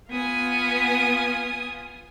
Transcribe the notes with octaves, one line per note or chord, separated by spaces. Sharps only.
B3 F4 G#5 D#6